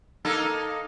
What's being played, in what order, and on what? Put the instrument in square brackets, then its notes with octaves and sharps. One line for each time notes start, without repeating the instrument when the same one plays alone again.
[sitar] A#3 D#4 A4